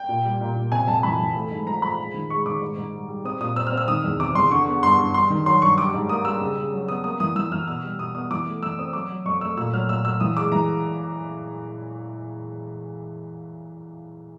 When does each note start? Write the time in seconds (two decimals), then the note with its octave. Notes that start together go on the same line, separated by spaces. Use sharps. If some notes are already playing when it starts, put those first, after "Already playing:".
Already playing: G5
0.09 A#2
0.25 G3
0.41 A#2
0.56 A#2
0.72 C3 G#5
0.88 F2 A5
1.03 E3 B5
1.19 E3
1.35 A3
1.51 G#2
1.67 F3 A#5
1.82 F3 B5
1.99 G#3
2.14 D#3
2.30 G#3 C#6
2.46 D#3 D6
2.62 G#2
2.77 G#2
2.93 G3
3.09 G3
3.24 C4 D#6
3.41 A#2 D#6
3.56 C4 E6
3.67 F6
3.72 C4
3.77 E6
3.88 D#3 D#6
4.04 E2
4.20 C3 D6
4.35 E2 C6
4.51 D3 C#6
4.67 B3
4.83 G2 C6
4.98 G2
5.14 G2 C6
5.30 D#3
5.46 F#3 C6
5.62 G2 C#6
5.78 G3 D6
5.93 G#2
6.09 A#3 D#6
6.25 G3 E6
6.41 C#3
6.57 C#3
6.73 F#3
6.88 B3 D#6
7.04 A#3 D#6
7.20 E3 D#6
7.36 E3 E6
7.51 E3 F6
7.67 B2 E6
7.83 G3
7.99 B2 D#6
8.15 B3 D#6
8.31 E3 D6
8.46 A3
8.63 E3 E6
8.78 C4 D#6
8.93 F#3 D6
9.10 F#3
9.26 F2 C#6
9.41 A3 E6
9.57 A#2 E6
9.73 F#3 F6
9.89 A#2 E6
10.04 F#3 E6
10.20 E3 D#6
10.36 G#3 D6
10.52 E3 A#5